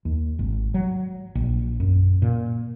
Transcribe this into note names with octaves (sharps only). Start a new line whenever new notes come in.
D#2
G#1
F#3
A#1
F#2
A#2